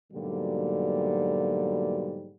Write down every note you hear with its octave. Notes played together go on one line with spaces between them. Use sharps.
G#2 B2 D3 F#3 G3 A#3